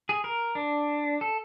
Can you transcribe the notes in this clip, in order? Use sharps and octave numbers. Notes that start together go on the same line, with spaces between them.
G#4
A#4
D4
A4